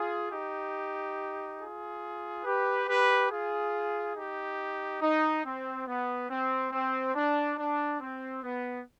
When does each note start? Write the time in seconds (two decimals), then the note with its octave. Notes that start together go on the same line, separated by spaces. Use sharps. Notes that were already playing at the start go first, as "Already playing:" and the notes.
Already playing: F4 G#4
0.31 D#4 G4
1.60 F4 G#4
2.45 G4 B4
2.88 G4 B4
3.30 F4 G#4
4.15 D#4 G4
5.01 D#4
5.45 C4
5.87 B3
6.29 C4
6.72 C4
7.15 D4
7.58 D4
8.00 C4
8.43 B3